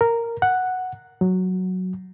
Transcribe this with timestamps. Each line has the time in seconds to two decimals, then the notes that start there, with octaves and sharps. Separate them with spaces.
0.01 A#4
0.42 F#5
1.21 F#3